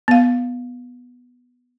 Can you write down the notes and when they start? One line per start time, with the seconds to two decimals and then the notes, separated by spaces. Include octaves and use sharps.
0.08 B3 F5